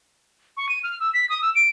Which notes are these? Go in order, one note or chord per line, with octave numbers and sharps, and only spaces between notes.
C#6
D#7
F6
E6
B6
D#6
E6
D7